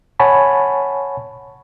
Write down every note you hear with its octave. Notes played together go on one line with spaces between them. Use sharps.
C#5 F#5 G#5 A5 B5 C#6